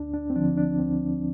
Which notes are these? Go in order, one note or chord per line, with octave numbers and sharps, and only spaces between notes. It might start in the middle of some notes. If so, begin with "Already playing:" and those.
Already playing: D2 D4
D4
C4
D3 F3 D4
D4
D2 C4